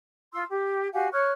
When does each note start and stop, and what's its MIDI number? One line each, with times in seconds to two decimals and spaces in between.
0.33 0.42 65
0.33 0.42 84
0.33 0.42 88
0.48 0.87 67
0.93 1.07 66
0.93 1.07 67
0.93 1.07 77
0.93 1.07 80
1.11 1.31 73
1.11 1.31 85
1.11 1.31 89
1.11 1.31 90